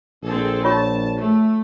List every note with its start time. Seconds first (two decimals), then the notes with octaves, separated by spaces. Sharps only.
0.23 A#1 C4 G#4 A4
0.64 F4 C#5 A5 C#6
1.18 A3